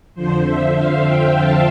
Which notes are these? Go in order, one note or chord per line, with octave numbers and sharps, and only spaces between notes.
F2 D3 F3 C5
E5
F5
G5
A5